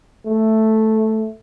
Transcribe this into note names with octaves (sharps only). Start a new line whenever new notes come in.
A3